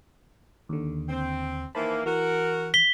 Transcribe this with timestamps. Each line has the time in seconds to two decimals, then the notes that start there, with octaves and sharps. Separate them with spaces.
0.69 D#2 D3
1.09 C4
1.75 D#3 E3 A#3 C5 A5 B5
2.06 E3 F#4 A#4
2.74 B6 G7